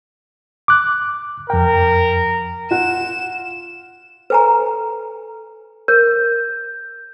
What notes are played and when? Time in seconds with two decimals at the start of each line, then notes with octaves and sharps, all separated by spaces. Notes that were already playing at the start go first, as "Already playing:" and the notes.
0.68 D6 F#6
1.50 F2 A#4 G5
2.71 F4 F#5 E7
4.30 A4 B4 G#5 A#5
5.88 A#4 G6